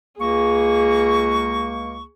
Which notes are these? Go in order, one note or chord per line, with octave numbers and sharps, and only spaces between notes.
C#2 A#3 G#4 C#6